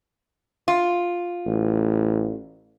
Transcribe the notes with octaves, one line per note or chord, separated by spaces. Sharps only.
F4
A1